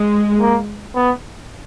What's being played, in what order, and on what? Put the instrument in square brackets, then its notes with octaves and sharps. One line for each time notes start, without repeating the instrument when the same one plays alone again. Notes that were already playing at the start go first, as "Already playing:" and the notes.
Already playing: [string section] G#3
[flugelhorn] A#3
B3